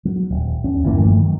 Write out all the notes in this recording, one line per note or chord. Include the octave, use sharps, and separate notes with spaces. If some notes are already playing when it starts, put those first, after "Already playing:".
F#3
D#1
E2 C#4
G1 E3 A#3
G2 D#3 F3 A3
D#3 F#3